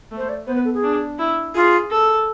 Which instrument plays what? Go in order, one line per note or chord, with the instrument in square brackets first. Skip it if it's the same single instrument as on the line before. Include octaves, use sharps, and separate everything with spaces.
[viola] A3
[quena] C5
D5
[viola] B3 [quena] C5
[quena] B4
A4
G#4
[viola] D4
E4
[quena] F4 [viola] G#4
[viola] A4